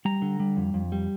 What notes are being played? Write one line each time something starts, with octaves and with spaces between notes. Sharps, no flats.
G3 A#5
D3
G3
F2
F2
G3